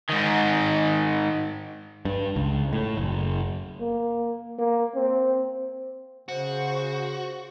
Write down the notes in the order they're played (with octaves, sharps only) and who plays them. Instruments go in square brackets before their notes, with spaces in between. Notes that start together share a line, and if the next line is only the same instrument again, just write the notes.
[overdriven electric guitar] G#2 D#3
[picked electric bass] G2
C#2
A2
F#1
[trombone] A#3
A#3
C4
[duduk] C#3 [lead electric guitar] F#4 [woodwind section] C5